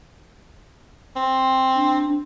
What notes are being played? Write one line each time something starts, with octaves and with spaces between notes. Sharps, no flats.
C4
D4